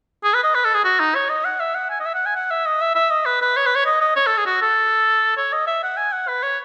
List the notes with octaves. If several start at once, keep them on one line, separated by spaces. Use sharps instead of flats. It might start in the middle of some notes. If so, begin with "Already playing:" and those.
G#4
B4
D#5
B4
A4
G#4
F#4
D#4
C#5
D#5
F#5
E5
F#5
G#5
D#5
E5
F#5
G#5
F#5
E5
D#5
E5
E5
D#5
B4
B4
C#5
B4
C#5
D#5
D#5
C#5
A4
G#4
F#4
A4
C#5
D#5
E5
F#5
G#5
F#5
B4
C#5